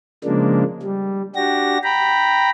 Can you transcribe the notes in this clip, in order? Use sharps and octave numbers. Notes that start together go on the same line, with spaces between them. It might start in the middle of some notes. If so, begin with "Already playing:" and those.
C#3 F3 G#3 A#3 D4
G3
D4 F#4 G4 A#6
G5 A#5 B5